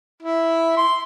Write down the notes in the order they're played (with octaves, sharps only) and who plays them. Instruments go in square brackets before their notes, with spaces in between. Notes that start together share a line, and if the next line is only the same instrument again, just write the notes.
[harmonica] E4
C6